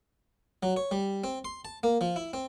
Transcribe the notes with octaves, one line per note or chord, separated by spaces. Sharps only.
F#3
C#5
G3
C4
C6
A5
A#3
F3
E4
C4